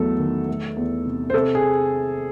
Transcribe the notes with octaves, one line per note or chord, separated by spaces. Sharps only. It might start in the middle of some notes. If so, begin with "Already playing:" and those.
Already playing: E2 F#3 A3 A4
D#3
A3
E2
C3
C5
C3 A4
G#4